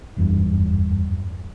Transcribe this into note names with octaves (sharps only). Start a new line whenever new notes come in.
F#1 E2 G2